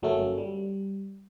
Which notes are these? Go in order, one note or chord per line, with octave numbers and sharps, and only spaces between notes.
G1 F#3 A3 A#3 C#4 A4
G3